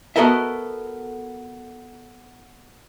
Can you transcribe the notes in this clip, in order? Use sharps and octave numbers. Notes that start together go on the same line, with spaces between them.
B3 F#4 A4 A#4 D#5 E5